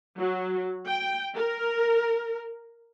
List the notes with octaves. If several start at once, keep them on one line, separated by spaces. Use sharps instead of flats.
F#3
G5
A#4